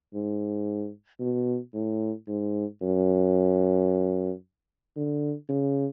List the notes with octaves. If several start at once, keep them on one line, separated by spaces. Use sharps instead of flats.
G#2
B2
A2
G#2
F#2
D3
C#3